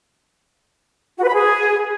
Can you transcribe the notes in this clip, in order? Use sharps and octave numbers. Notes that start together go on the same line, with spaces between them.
F#4
B4
B5
G#4